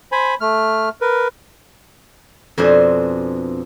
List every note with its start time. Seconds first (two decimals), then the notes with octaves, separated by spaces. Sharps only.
0.12 C5 G#5 B5
0.41 A3 F6
1.01 A#4 B4
2.58 F2 B2 D4 C5 G#5